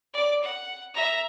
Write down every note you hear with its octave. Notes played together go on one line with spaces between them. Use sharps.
D5 D6
F#5
E5 A#5